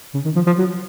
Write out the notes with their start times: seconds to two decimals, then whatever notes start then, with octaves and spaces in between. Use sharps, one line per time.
0.14 C#3
0.25 D#3
0.36 F3
0.47 F3
0.58 F#3